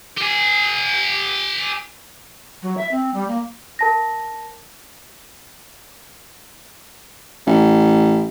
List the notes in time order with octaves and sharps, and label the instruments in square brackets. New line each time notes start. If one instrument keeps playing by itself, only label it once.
[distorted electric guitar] G4 G#5
[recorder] F#3
E5
C4
G3
A#3
[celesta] A#4 A5 A#6
[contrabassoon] A1